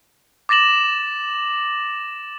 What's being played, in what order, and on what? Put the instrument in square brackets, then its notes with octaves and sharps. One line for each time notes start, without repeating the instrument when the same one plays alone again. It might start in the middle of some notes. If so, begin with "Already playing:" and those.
[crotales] D6 A6 A#6 E7 F#7